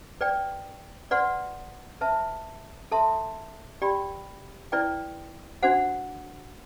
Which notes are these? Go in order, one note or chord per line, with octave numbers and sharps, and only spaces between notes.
B4 D5 G5
B4 D5 F#5 C6
B4 E5 A5
A4 E5 A5 C6
G4 D5 G5 B5
E4 B4 D5 G5
D4 F#4 C5 F#5